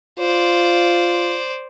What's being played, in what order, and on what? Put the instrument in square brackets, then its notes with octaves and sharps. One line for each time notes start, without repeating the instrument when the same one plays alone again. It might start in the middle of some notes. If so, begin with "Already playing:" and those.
[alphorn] F4 [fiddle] C5 D5